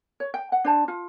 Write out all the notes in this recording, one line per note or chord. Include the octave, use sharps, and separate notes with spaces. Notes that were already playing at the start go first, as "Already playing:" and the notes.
C#5
G5
F#5
D4 C5 A5
F4